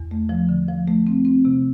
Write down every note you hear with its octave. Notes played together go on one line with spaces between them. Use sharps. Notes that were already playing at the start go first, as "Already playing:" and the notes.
Already playing: E2
A3
F3
D3
F3
A3
C4
C4
C3